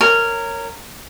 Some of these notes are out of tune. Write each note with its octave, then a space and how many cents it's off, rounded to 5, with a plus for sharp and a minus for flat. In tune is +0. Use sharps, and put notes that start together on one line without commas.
A#4 -15 C#5 +0